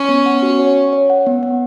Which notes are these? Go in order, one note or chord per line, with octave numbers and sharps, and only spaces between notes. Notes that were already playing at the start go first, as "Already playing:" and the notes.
Already playing: C#4
B3
F#5
F#4
C#5
F#5
C#5
F#5
B3
F#5